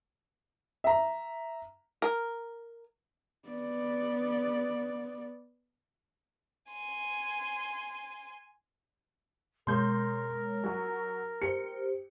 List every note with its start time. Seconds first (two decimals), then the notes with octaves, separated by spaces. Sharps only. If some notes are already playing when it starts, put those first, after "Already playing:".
0.84 E5 A#5
2.02 A#4
3.49 B3 D5
6.70 G#5 C6
9.67 B2 G#3 A#4 C#5 C6 G6
10.64 F#3 F#4 G#5
11.42 G4 C5 C#7